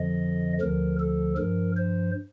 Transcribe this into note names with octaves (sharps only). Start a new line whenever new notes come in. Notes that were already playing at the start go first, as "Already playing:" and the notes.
Already playing: F2 D3 F3 D#5
D2 D3 F3 A#4
A4
G2 F3 A#4
C5